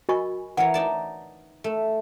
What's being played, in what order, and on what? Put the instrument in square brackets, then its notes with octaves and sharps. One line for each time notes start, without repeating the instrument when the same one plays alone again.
[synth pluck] F#4 G#5 B5 [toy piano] A#4 D#5 C#6
[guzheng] E3 A#4 C#5 [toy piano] F#5
[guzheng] D#4 D5 A5
A3